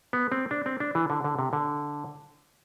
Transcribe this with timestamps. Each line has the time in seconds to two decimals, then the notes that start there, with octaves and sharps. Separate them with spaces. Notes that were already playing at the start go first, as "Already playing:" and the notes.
0.13 B3
0.32 C4
0.51 D4
0.66 C4
0.80 D4
0.95 E3
1.10 D3
1.24 D3
1.39 C3
1.53 D3